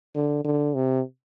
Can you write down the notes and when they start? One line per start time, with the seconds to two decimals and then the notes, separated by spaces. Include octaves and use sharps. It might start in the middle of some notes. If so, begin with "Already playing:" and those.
0.15 D3
0.44 D3
0.74 C3